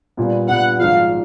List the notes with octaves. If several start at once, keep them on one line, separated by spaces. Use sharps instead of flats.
A#2 G3 B3
A#2 G3 B3 F#5
G#1 G#2 F3 F5